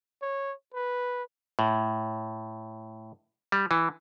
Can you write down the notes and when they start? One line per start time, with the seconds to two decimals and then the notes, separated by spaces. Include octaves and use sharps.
0.22 C#5
0.74 B4
1.59 A2
3.52 G3
3.71 E3